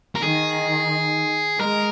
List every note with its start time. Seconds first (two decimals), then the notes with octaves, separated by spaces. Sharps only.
0.15 A#4
0.22 D#3 G#4
1.59 G#3 A#4